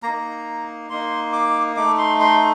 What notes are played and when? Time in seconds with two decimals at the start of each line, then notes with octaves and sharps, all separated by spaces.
0.03 A#3 D#4 A#5
0.90 A#3 D#4 C6
1.33 D6
1.76 A3 D#4 D6
1.98 C6
2.20 C6